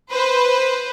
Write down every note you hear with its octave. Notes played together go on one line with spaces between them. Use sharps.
B4 C5